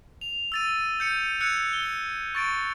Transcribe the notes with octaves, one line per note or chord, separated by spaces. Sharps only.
F7
E6 A6 D#7
G6 C#7 D#7
E6 F#6 G#6 C#7
G7
C#6 A6 D7